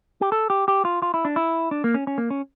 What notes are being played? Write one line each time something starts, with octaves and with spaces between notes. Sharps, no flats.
G4
A4
G4
G4
F4
F4
E4
D4
E4
D4
A#3
C#4
C#4
A#3
C#4